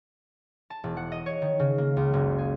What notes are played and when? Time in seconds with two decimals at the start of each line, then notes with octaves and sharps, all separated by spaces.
0.70 A5
0.84 E1
0.97 F#5
1.12 D#5
1.26 C#5
1.42 D#3
1.59 C#3
1.78 A#3
1.97 C#2
2.13 F#1
2.38 G#4